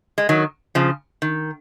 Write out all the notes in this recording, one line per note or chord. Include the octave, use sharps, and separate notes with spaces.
G#3
D#3 F#3
C#3 F3
D#3